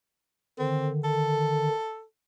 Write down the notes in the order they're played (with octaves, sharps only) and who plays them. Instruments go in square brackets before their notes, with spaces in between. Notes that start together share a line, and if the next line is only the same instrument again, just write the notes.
[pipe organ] D3 D#3 [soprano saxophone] C4
[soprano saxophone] A4